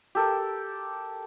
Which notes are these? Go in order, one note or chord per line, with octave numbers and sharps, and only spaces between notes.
G4 A4 A#4